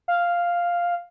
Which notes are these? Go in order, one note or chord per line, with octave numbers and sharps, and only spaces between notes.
F5